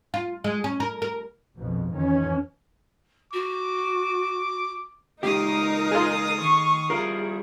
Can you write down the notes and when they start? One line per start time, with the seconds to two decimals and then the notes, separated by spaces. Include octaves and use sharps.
0.14 F4
0.44 G#3
0.64 C#4
0.80 A#4
1.02 A#4
1.58 A#1 F2 B2 F3
1.94 F2 D#3 E3 C#4
3.33 F#4 D6
5.23 C#3 G#3 A#3 D#4 G4 A#4 F5 D#6
5.91 F4 G#4
6.42 D#3 C#6
6.90 G3 E4 F4 G#4 A#4